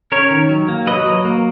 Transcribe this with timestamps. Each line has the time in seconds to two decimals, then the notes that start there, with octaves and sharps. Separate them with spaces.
0.12 C#4 A#4 C#5
0.31 D#3
0.49 F#3
0.68 A#3
0.87 F#3 B4 D#5
1.06 F#3
1.25 A#3